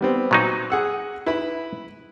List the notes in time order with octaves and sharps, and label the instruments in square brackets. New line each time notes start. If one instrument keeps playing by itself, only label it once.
[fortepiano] G3 B3 C4
[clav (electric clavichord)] A#2 F#3 D#4
[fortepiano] G#4 F#5 E6
E4 B4 B5